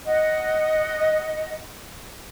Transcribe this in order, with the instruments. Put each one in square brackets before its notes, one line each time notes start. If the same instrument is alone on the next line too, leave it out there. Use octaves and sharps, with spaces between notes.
[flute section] D#5 F#5